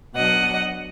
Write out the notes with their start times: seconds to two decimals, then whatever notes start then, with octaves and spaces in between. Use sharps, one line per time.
0.15 B2 F#3 D4 D#5 F#5